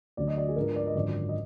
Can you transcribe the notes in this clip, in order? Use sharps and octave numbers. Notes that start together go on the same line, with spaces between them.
D2 D3 F#3 D5
D#5
D5
G#4
G#2 F3 B3 D4 A#4
D5
D#5
G#1 F#2 D3 F3 D5
D#5